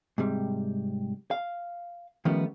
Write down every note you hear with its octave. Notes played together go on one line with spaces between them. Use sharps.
G#2 C3 G3
F5
D#3 F3 G3 A3 B3 C#4